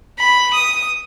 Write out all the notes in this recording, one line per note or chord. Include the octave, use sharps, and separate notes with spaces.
B5
D#6